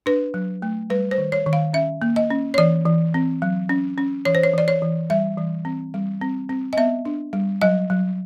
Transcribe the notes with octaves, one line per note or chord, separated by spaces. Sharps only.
D4 B4
F#3
A3
G3 B4
C5
D#3
C#5
D#3
F5
C#4 E5
A#3
D#5
C#4
C#5
E3 D5
E3
C4
F#3
C#4
C#4
E3 C#5
C5
C#5
E3 D5
C#5
E3
G3 E5
E3
C4
G3
C4
C4
D#5
B3 E5
D4
G3
F#3 D#5
F#3